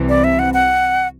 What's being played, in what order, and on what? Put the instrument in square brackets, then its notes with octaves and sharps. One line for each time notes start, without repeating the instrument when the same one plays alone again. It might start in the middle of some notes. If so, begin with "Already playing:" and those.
Already playing: [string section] C2 C3 E3
[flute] D5
E5
F#5
F#5